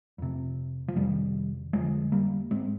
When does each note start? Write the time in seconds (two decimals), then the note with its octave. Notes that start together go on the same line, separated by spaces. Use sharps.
0.18 F2 C3
0.88 F3
0.96 F2 C3 D#3 G3
1.73 F2 D3 F3 G#3
2.12 G3 A#3
2.51 G#2 G#3 C4